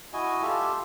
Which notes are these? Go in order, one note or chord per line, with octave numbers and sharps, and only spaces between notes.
E4 F#4 D#5 G#5
F4 G4 A4 E5